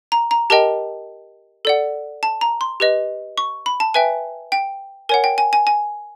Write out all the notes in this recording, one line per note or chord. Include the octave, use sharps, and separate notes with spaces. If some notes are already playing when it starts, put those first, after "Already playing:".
A#5
A#5
G4 A#4 D#5 G5 A5
A4 D5 F#5
A5
A#5
C6
G4 B4 D#5
C#6
B5
A5
B4 E5 G5 G#5
G5
A#4 C#5 F#5 G#5
G5
G#5
G#5
G#5